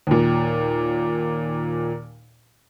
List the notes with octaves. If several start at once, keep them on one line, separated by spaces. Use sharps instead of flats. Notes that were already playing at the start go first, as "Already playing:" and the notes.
D#2 A#2